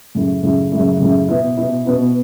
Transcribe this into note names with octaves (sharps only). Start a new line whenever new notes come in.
F#2 C#3 A3 E4
F#2 C#3 A3 E4
F#2 C#3 A3 E4
F#2 C#3 A3 E4
B2 B3 E4
B2 B3 E4
B2 B3 E4